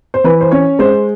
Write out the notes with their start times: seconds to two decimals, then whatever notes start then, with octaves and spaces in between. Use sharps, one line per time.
0.14 C5
0.24 E3 B4
0.41 C5
0.51 C#4 C#5
0.79 G#3 C5